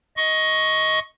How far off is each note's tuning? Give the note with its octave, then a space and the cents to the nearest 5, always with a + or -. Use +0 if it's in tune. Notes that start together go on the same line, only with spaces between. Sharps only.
D#5 +15 C#6 +0